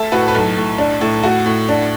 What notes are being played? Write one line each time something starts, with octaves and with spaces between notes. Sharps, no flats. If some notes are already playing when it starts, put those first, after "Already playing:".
Already playing: A3 E5 A5
A2 F#4 B4
B4
B1 A4
A2
D4
A2
A3 F#4
A2
D4